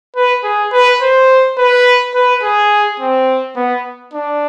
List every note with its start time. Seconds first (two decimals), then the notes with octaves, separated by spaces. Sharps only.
0.16 B4
0.44 G#4
0.72 B4
1.01 C5
1.58 B4
2.14 B4
2.43 G#4
3.00 C4
3.56 B3
4.13 D4